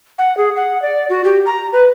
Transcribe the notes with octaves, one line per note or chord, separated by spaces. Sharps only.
F#5
G#4
F#5
D5
F#4
G4
A#5
B4